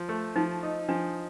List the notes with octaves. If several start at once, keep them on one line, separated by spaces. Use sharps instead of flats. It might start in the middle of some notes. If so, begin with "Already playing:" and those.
Already playing: F3
A3
F3 D#4
D#4
F3 D4